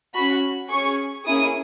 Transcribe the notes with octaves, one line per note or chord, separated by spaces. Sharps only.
C#4 F#4 B5
C#4 G#4 C#6
A#3 C#4 E4 G#4 D#6